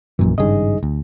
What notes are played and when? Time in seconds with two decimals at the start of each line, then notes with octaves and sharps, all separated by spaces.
0.19 A#1 F#2 A#2 E3
0.38 G#1 G2 C#3 D#4 G#4 D#5
0.83 D2